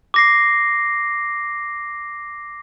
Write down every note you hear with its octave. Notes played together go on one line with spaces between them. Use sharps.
D6 A#6 C7